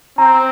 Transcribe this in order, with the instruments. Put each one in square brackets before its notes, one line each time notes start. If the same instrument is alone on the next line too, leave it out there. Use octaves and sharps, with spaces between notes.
[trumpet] C4 [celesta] A#5